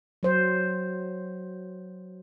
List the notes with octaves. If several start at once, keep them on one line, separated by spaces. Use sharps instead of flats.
F#3 C5